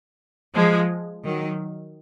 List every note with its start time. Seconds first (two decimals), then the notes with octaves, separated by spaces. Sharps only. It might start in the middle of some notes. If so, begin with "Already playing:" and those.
0.54 F3 G#3
1.24 D#3 F#3